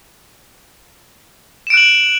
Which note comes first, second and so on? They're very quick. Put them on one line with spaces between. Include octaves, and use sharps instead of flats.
E7 D7 F#6 F#7